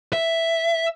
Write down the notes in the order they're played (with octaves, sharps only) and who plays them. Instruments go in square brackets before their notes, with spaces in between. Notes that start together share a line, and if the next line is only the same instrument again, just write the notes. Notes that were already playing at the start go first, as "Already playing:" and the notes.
[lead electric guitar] E5